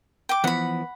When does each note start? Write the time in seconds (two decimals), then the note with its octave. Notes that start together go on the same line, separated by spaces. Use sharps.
0.29 G5 D6
0.44 E3 F3 B3 F#5 B5